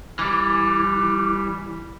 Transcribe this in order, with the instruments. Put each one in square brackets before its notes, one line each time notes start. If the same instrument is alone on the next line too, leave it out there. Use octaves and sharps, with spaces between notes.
[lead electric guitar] E3 G3